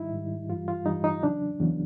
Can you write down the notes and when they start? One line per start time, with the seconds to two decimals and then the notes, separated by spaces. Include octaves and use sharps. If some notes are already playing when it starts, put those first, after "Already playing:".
Already playing: G#2 D#3 G3 D#4 E4
0.12 G#2 D#3 G3
0.48 G2 E3 G3 F4
0.68 F4
0.86 G2 E3 G3 D#4
1.04 D#4
1.22 E2 C#3 F#3 D4
1.60 E2 C#3 F#3